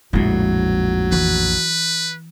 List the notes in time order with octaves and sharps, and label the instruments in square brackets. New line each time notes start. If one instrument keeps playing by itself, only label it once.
[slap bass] A#1 F2 A2 [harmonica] F#3 [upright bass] G#3 E4
[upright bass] E3 [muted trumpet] B4